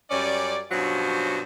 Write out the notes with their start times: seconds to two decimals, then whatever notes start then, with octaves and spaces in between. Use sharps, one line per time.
0.11 F#2 G3 C#4 D5
0.71 G2 B2 F3 F#3 C#4 C5